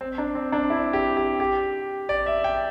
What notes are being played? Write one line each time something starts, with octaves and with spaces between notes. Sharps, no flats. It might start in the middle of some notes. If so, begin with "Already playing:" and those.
C4
D4
C4
D4
E4
G4
G4
G4
D5
E5
G5